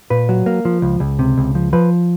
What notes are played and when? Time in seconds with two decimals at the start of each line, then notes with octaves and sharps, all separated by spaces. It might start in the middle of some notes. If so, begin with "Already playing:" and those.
0.10 A#2 B4
0.29 F#3
0.46 A#3
0.65 F3
0.82 C#2
1.00 C#2
1.19 C3
1.37 C#2
1.55 F3
1.73 F3 B4